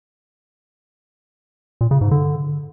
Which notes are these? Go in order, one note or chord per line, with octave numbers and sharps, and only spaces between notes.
A#2
C#3
G#2
D3